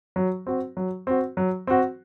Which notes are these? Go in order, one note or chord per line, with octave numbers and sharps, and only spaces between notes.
F#3
C4 F#4
F#3
C4 F#4
F#3
C4 F#4